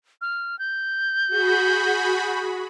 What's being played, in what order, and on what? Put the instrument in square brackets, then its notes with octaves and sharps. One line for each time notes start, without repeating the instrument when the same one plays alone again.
[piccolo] F6
G6
[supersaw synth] F#4 G#4 B5